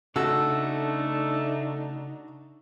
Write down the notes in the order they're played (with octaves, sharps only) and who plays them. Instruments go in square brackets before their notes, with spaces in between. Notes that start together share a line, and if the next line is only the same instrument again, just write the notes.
[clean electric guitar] C#3 A4 [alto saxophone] A3 [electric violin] D4 D#4 [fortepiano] F#4 E6